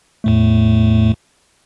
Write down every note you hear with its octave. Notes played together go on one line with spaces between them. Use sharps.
E2 A2 A3